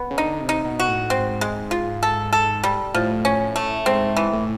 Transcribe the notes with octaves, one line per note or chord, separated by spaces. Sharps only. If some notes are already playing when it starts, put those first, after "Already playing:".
Already playing: B3
C#3
D3 D#4
C3
D#4
B2
F#4
A2
G#2 C4
G#3
F4
A4
A4
G3
A2 F3
C#4
A3
G#2 C4
E3
A2